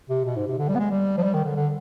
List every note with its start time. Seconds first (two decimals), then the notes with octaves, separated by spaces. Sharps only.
0.09 C3
0.25 B2
0.36 G#2
0.47 C3
0.58 D3
0.69 G3
0.75 B3
0.79 G#3
0.91 G3
1.17 F3
1.23 G3
1.34 D#3
1.45 D3
1.56 D3